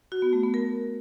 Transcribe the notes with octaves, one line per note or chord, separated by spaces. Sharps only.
F#4
B3
A3
B3
A#4